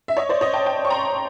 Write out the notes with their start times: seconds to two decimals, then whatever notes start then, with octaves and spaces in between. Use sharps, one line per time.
0.08 E5
0.17 C#5 D#5
0.29 C5 D5
0.41 C#5 D#5
0.53 G5 A5
0.66 G5 A5
0.85 C#6
0.90 A#5 C6